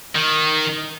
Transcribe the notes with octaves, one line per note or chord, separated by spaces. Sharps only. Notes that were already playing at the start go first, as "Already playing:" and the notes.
D#3